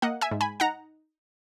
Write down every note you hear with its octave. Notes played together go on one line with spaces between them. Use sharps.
A#3 D#5 F#5
E5 G#5
G#2
G#5 B5
D#4 F#5 A#5